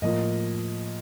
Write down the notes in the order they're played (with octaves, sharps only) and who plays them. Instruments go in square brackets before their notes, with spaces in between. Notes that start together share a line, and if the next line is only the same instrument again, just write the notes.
[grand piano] A2 F3 A#3 F4 D#5